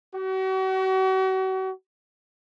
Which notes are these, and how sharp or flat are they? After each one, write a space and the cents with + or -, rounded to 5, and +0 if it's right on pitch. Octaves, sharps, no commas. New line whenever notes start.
F#4 +40